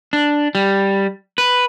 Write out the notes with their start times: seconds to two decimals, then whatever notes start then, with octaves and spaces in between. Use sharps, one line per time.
0.13 D4
0.55 G3
1.38 B4